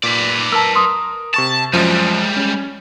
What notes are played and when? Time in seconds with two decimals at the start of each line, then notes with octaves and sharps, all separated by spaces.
0.03 A#2 B4 D5
0.52 A#4 A5 E6
0.75 C6 D#6
1.34 C3 A5 C#6 A6
1.73 F#2 F3 G3 G#3 D#7
2.37 C#4